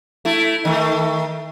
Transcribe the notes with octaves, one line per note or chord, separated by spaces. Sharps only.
A3 E4
D#3 A3